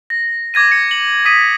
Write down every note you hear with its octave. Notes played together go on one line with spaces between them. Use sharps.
A#6
D6 G#6 A#6 D#7
C#7
F#7
D#6 B6 D#7